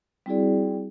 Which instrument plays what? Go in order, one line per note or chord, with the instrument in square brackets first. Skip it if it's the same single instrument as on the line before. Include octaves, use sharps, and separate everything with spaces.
[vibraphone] G3 C4 E4 F#4 G#4 D5